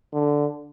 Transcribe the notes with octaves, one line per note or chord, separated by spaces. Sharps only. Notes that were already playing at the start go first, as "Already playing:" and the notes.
D3